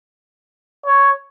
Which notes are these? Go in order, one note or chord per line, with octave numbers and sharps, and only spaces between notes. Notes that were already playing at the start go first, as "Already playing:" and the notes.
C#5